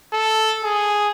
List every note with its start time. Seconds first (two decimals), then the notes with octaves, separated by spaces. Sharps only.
0.13 A4
0.64 G#4